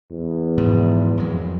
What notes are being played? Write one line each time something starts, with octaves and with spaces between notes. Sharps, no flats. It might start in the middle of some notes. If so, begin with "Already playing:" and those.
E2
G#2 B2 F3
F2 F#3